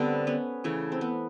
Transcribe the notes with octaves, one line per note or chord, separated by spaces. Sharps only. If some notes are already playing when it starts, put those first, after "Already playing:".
Already playing: D3 G3 A3 B3 C4 D4
B3 C#4
C#3 E3 A3
C4
B3